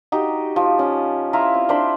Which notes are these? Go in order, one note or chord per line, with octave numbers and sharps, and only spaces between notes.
D#4 F#4 G4
F3
C#4
E4 F4 E5 A#5
C4
D4 C5 B5